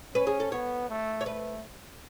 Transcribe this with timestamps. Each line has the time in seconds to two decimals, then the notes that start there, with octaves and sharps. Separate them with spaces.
0.14 C#4 B4
0.27 G#4
0.40 A4
0.52 B3 C#5
0.89 A3
1.21 C#5
1.26 A3 B4